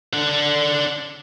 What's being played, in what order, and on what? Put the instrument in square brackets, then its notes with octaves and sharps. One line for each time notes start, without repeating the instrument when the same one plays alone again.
[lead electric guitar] D4 F#5